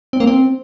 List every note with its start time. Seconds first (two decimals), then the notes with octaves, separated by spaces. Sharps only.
0.13 C4
0.20 A#3
0.27 C4